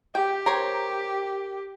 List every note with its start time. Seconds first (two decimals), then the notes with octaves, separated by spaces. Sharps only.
0.15 G4 G5
0.46 A#4 C5 C#5